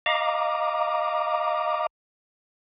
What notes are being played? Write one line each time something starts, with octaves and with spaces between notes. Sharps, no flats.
D#5 F5 A#5 D6